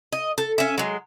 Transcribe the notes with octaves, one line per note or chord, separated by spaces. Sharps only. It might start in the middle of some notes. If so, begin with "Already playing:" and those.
D#5
A4
C#4 E5
F#3 G#3